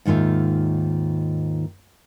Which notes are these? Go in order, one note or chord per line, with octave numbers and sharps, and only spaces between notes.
D#2 G#2 D#3 F4 E5